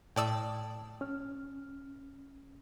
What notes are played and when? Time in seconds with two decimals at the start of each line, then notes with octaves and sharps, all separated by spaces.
0.16 A2 D5 G5 A5 D#6 E6
1.01 C#4 F6